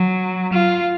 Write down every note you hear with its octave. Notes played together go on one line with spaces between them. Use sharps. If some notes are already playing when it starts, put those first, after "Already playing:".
Already playing: F#3
F4